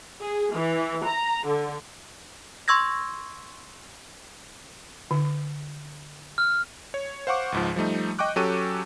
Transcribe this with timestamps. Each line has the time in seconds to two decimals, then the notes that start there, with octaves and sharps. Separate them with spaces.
0.20 G#4
0.55 E3
1.06 A#5
1.46 D3
2.68 C6 C#6 E6 G#6 A#6
5.11 D3
6.38 F6
6.94 C#5
7.27 C5 F5 F#5 C#6 D6
7.52 C#2 G#2 F3
7.76 F3 G3 A3 D#4
8.19 D#5 G5 C#6 D6 F#6
8.36 F#3 C#4 G4 A4 C#6 D#7